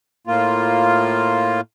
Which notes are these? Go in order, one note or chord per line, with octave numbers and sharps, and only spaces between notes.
A2 A#3 F4